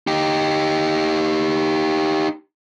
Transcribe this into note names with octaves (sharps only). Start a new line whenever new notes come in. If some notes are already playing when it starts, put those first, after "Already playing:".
D#4 G4